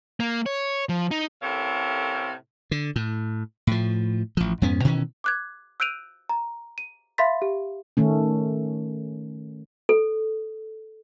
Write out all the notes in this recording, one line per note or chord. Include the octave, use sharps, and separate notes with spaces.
A#3
C#5
F3
D#4
A2 C3 C#4 A4 A#4 F5
D3
A2
A2 F3
A1 F3
F2 G#2 B3 C#4
B2 D#3 E3 C#4
D6 F#6 G#6
E6 F#6 G6 D7 D#7 F7
A#5
D#7
E5 F5 B5 C6 A6 B6
G4
D#3 A3 C#4
A4